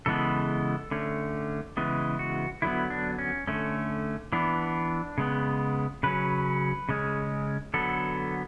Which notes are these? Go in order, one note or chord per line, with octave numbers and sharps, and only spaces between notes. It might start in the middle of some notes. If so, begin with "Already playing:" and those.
C#3 E3 G#3 B3 A4
D3 A3 C#4
C#3 E3 G#3 B3
F#4
D3 F#3 B3 E4
D4
C#4
D3 A3 C#4
E3 B3 D4
C#3 G#3 B3
C#3 F#3 C#4 B4
C#3 G#3 C#4
D3 F#3 B3 A4